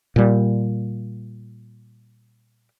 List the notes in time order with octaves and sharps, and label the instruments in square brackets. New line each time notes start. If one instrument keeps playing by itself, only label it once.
[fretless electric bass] A#2 G3